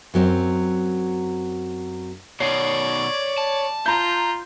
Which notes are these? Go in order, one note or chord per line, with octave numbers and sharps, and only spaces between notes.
F#2 F#3 C4
B2 D#3 C#5 D5 C7
A5
F4 A#5 G6